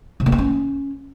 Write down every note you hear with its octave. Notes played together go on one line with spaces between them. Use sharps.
C3
A#3
B3
C#4